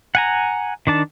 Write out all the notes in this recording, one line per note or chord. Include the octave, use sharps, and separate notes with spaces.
F#5 G#5 A#5
D#3 D4 A5